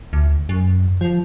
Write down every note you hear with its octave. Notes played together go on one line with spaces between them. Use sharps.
D2
F#2
F3